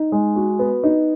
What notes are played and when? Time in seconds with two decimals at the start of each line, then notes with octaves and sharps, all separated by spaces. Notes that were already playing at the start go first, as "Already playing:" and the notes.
Already playing: D#4
0.12 G#3
0.36 F#4
0.59 B3
0.83 D#4